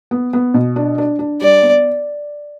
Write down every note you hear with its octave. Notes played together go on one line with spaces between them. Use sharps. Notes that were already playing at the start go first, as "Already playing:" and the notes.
B3
B3
B2
D4
D4
D4
G3 D5
B3